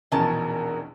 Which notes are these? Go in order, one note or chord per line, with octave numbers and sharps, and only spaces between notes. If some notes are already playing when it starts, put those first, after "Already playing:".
A#1 E2 B2 D#3 C#4 A#4 A5